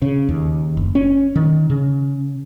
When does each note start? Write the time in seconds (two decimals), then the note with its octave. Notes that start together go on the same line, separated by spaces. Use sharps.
0.02 C#3
0.29 D#2
0.77 F#1
0.95 C#4
1.36 D#3
1.70 C#3